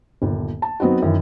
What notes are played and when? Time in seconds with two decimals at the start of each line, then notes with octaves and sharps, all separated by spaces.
0.22 G1 D#2 A#2
0.62 A5
0.80 F#3 B3 C4 D#4 F#4
1.02 F#2 D#3 E3